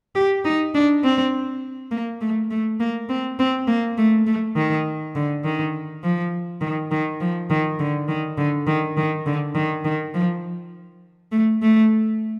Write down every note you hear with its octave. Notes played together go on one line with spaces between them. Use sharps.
G4
D#4
D4
C4
A#3
A3
A3
A#3
C4
C4
A#3
A3
A3
D#3
D3
D#3
F3
D#3
D#3
F3
D#3
D3
D#3
D3
D#3
D#3
D3
D#3
D#3
F3
A3
A3